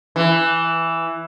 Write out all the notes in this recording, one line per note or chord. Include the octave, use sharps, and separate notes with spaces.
E3